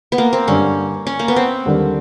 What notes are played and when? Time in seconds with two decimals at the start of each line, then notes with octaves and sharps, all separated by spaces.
0.12 B3
0.18 A#3
0.33 C4
0.48 G2 D3 G3 C#4
1.07 C#4
1.19 A#3
1.28 B3
1.36 C4
1.65 D#2 D3 G3 A#3 D4